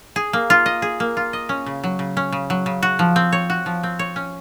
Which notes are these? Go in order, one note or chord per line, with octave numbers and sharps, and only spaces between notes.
G#4
A#3
F4
D#5
G#4
A#3
F4
D#5
C#4
C#3
F#3
C#3
C#4
C#3
F#3
C#3
F#4
F3
C4
C#5
F#4
F3
C4
C#5
C#4